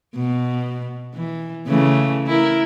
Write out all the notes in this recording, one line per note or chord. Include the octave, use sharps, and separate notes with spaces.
B2
E3
C#3 E3 A3
E4 A#4